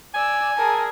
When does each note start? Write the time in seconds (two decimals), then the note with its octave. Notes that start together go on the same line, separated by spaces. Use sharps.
0.14 D5 G#5 E6
0.57 G#4 A#4 A5